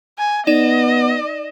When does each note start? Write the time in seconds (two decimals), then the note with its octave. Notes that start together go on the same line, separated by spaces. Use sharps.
0.18 G#5
0.47 B3 D#4 D5 D#5 E7